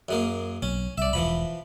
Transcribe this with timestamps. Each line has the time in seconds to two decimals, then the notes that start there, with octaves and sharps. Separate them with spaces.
0.09 F#2 G#3 A#3
0.62 B1 C#4
0.98 C2 D5 E5
1.13 E1 E3 F3 B5